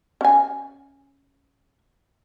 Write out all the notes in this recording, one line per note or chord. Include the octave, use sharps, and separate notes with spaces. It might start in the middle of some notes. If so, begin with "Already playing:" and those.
C#4 G#5